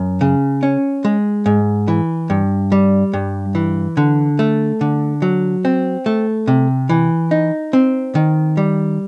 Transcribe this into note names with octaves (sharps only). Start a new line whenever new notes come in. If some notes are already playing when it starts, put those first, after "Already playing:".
Already playing: F#2
C#3
C#4
G#3
G#2
E3
G2
G3
G2
E3
D3
A3
D3
F#3
C4
A3
C3
E3
D#4
C4
D#3
G3